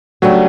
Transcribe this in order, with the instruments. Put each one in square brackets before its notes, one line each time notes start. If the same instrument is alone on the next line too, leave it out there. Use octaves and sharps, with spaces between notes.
[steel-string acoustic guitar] C#3 G3 D4 F#4 [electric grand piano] F#3 A3